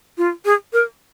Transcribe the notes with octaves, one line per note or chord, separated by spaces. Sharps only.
F4
G#4
A#4